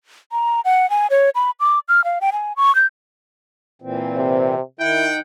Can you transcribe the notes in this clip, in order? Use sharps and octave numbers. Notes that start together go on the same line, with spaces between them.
A#5
F#5
G#5
C#5
B5
D6
F6
F5
G5
G#5
C#6
G6
A#2 E3 C4
C3
D#3 E4 F#5 G5